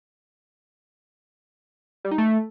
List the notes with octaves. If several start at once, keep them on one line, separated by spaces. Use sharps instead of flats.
G3
D#4
A3